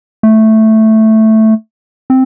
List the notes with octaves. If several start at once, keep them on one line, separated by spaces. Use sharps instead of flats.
A3
C4